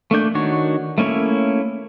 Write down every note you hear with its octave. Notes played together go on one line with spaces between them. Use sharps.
A3 A#3 D4 G6
D#3 D4 F#4 C#5
A3 A#3 C#4 E4 C#5